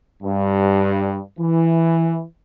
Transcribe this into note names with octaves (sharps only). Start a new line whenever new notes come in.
G2
E3